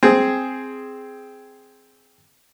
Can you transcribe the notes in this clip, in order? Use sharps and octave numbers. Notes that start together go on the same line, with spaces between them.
C4 G#4